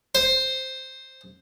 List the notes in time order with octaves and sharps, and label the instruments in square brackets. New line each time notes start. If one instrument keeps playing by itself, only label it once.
[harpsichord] C5